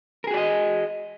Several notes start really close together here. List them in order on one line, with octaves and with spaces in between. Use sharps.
A#4 G#4 F#4 D5 D#5